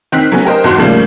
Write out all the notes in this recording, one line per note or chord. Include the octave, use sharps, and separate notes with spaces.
D#3 C4 F#6 B6
F#3 A3 B3 C#4
G4 A#4 C5 D#5
G1 E2 D#3 F#4 C6
A2 C#3 F3 G3 A#3